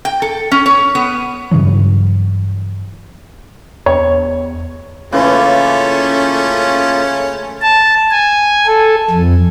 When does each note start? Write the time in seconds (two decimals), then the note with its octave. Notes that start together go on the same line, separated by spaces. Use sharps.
0.05 G5
0.22 A4
0.52 C#4
0.66 C#5
0.95 B3
1.51 G2 C#3 E3 F#3
3.86 E2 C#5
5.12 C#3 E3 A3 A#3 C#4 F4
7.62 A5
8.11 G#5
8.67 A4
9.11 F2